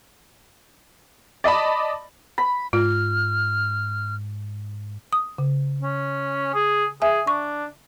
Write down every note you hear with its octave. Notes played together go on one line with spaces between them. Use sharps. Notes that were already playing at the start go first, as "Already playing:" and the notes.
D5 D#5 A5 B5
B5
G#2 F4 F6
D#6
C#3
C#4
G#4
G#4 E5 G#5
D4 C#6